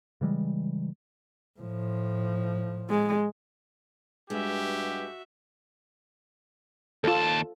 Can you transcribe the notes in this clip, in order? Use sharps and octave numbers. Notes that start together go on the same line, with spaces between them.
C#3 E3 G3 G#3
A2 F3
G#3
G2 G#3 B3 F#4 G4 E5
D#2 F4 A4 A5